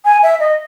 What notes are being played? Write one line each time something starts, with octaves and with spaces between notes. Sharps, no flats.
G#5
E5
D#5